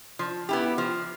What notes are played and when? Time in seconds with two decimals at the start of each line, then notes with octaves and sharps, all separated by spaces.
0.19 F3
0.49 B3 E4 G4
0.78 F3